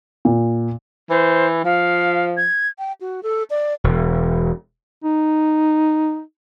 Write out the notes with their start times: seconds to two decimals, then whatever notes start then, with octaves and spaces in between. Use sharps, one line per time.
0.25 A#2
1.10 E3 C5
1.65 F3 F5
2.37 G#6
2.79 G5
3.01 F#4
3.23 A4
3.50 D5
3.84 E1
5.04 D#4